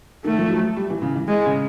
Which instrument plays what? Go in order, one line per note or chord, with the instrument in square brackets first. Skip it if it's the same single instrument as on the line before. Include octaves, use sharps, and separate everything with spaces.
[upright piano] D#3 [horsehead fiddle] A3
[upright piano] F3
F#3
G3
E3
C#3
E3
[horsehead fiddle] G#3
[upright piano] C#3